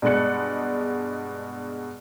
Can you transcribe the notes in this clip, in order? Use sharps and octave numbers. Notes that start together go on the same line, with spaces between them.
G2 B2 G#3 D5 F#6 C#7